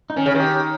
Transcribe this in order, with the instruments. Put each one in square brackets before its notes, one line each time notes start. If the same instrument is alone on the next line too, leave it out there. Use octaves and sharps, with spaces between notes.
[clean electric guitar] D#4
[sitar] D#3 [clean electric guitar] C#4
[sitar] C#3
D#3
[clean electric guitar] G4